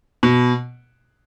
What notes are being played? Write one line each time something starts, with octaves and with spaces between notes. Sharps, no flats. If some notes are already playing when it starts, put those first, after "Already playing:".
B2